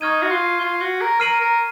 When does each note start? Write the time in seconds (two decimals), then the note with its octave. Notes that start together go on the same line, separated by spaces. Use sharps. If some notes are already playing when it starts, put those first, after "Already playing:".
0.01 D#4 C#6 F6 G#6 D#7
0.22 F#4
0.30 F4
0.60 F4
0.81 F#4
1.01 A#4
1.20 A#4 F6 C7 D#7 F#7
1.40 A#4